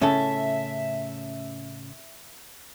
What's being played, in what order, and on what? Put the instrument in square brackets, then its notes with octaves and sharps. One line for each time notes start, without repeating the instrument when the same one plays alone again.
[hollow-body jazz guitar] A2 C#3 A4 [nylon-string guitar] C#4 [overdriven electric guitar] E5